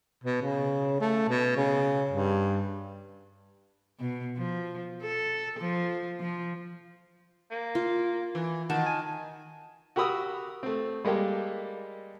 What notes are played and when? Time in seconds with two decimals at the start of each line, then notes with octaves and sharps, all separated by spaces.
0.24 B2
0.42 C#3
1.01 A3
1.29 B2
1.57 C#3
2.11 G2
4.00 B2
4.37 F3
5.02 A4
5.60 F3
6.20 F3
7.51 A#3
7.75 F4
8.35 E3
8.70 D#3 F#4 A5
8.86 G#5
9.96 F#4 G4 A#4 B5 D#6 E6
10.63 A3 C4
11.05 G3 G#3 A#3 G4 A4